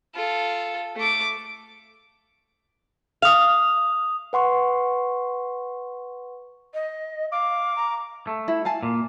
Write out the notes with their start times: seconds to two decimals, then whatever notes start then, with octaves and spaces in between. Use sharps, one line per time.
0.15 F4 A4
0.96 A3 D6
3.22 F5 D#6 F7
4.33 B4 F#5 C6 C#6
6.74 D#5
7.32 F5 D6
7.76 A#5
8.27 A3
8.48 E4
8.65 F5 G#5 A5
8.83 A#2